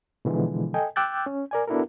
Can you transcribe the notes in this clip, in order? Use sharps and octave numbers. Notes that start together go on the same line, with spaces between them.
B2 D3 E3 F3 G#3
A4 D#5 G5 G#5
G5 D6 E6 F#6 G6 A6
C#4
A#4 D5 G#5
B3 D4 E4 F#4 A4 A#4